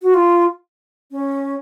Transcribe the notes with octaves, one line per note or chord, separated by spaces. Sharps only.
F#4
F4
C#4